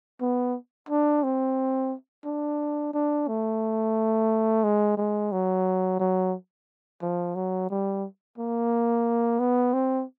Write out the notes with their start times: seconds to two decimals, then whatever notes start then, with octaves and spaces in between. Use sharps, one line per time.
0.21 B3
0.89 D4
1.23 C4
2.25 D4
2.94 D4
3.28 A3
4.64 G#3
4.98 G#3
5.32 F#3
6.00 F#3
7.02 F3
7.35 F#3
7.70 G3
8.38 A#3
9.39 B3
9.73 C4